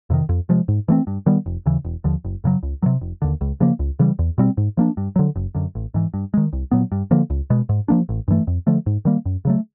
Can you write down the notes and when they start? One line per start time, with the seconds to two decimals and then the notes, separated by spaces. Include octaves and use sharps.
0.10 F2 C3 D#3
0.29 F2
0.49 C3 F3 G#3
0.68 G#2
0.88 E3 A3 C4
1.07 G2
1.26 D#3 G3 B3
1.46 F1
1.66 D#2 C#3 E3
1.85 E1
2.04 D#2 D3 F3
2.24 F#1
2.44 F#2 C#3 F#3
2.63 C#2
2.82 D#3 F#3
2.86 C3
3.01 F1
3.22 D#2 D3
3.41 C#2
3.60 C#3 F3 A#3
3.79 C#2
3.99 C#3 E3 G3
4.19 E2
4.38 B2 G3 C4
4.57 G#2
4.77 F3 A#3 D4
4.97 G2
5.16 D3 F#3
5.36 F#1
5.55 F#2 D3
5.75 A1
5.94 G#2 E3
6.14 G2
6.34 D#3 G#3
6.53 C2
6.71 A#2 F#3 B3
6.92 G2
7.11 D3 F3 A#3
7.30 C#2
7.50 B2 G#3
7.69 G#2
7.88 F3 A#3 D4
8.09 A1
8.28 G2 E3 A3
8.47 F2
8.67 D3 F3 A3
8.86 G#2
9.05 D#3 G3 A#3
9.26 F#2
9.45 C#3 F#3 A3